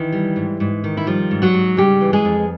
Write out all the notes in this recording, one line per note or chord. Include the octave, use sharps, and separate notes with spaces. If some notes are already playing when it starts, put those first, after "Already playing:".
Already playing: D#3 E3 E4
G3
G#2
G#2
D#3
E4
F3 G3 F4
G#2
F#3 F#4
G#2
C#3 G3 G4
E3
G#3 G#4
F2